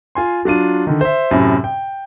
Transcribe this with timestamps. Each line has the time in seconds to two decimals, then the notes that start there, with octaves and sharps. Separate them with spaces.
0.15 F4 G#5 C6
0.45 F#3 D4 F4 D#7
0.87 D3 D#3
1.01 C5 E5
1.31 F#2 A2 C3
1.64 G5